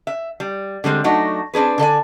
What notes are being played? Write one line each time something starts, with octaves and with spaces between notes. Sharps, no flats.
E5
G3
D3 G3 G#3 C4
F#3 A3 D4 D#4 F#4
C4 D4 G#4 B4
D3 A4 D5 G#5